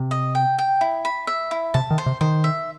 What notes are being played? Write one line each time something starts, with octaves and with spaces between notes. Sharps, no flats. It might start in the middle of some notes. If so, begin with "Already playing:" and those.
Already playing: C3
D#5
G5
G5
E4
B5
E5
E4
C3 A5
D#3
C5
C3
D#3 C5
E5